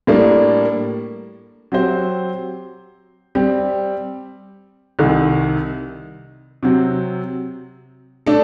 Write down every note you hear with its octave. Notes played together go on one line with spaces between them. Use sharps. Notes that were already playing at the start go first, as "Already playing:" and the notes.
A2 G3 A#3 D4
F#3 C4 G4 C5
G3 C4 G4
C2 C3 D#3
C3 F#3 C4
A3 D4 A4